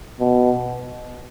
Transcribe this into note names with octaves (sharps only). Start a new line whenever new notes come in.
B2